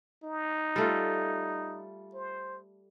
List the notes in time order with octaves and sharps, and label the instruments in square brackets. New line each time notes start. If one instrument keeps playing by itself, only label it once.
[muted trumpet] D#4
[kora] G3 A3 F4
[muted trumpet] C5